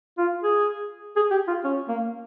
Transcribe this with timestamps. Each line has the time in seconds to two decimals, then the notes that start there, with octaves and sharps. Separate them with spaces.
0.18 F4
0.43 G#4
1.16 G#4
1.31 G4
1.48 F4
1.64 C#4
1.88 A#3